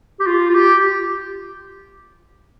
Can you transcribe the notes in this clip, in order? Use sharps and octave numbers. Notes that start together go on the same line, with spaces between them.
G4
F4
F4
G4